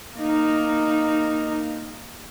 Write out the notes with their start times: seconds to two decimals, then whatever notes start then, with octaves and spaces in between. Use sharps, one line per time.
0.16 A#3 D#4